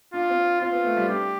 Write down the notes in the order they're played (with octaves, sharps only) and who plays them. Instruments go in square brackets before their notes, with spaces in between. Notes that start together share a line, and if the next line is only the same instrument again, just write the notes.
[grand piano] D4 [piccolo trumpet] F4
[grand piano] C4
[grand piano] C4 [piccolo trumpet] F4
[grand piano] B3
A3
G3
[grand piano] D4 [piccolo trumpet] G4